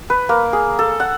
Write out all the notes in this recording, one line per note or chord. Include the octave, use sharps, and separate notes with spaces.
B4
A#3
G#4
A4
F#5